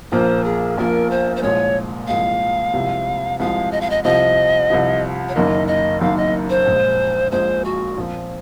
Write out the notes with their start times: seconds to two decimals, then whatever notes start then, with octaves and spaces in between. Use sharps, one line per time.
0.12 A#1 A#2 F3 A#3 F4 C5
0.44 G#4
0.77 A#1 A#2 F3 A#3 F4 A#4
1.11 C5
1.36 C5
1.43 C2 A#2 F3 G#3 C#5
2.08 C2 A#2 F3 G#3 F5
2.73 C2 C3 F3 G#3
3.40 C2 C3 F3 G#3 F5
3.72 D#5
3.81 F5
3.90 D#5
4.04 C2 C3 F3 D#5
4.70 C2 C3 F3
5.29 C#5
5.35 F#1 F#2 D#3 A#3 D#5
5.68 D#5
6.01 F#1 F#2 D#3 A#3 F5
6.17 D#5
6.50 C5
6.66 A#1 A#2 G#3
7.32 A#1 A#2 G#3 C5
7.65 F#4
7.97 A#2 F3 C4